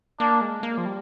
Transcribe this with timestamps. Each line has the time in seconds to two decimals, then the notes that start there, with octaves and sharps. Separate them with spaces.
0.20 A#3 D4
0.41 G#3
0.63 A#3
0.78 F3
0.85 G3